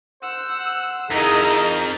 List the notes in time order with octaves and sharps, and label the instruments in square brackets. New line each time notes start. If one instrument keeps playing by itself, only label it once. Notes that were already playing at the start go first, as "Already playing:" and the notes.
[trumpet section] C5 F#5 [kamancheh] E6
[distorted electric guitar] F2 [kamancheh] D#4 D#5 [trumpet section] E4 A#5 [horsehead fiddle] G#4 A#4